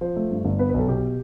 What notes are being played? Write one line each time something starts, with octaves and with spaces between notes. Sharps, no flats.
F3 C5
A3
G2
G1
B3 B4
B4
B1 A4
B2 G4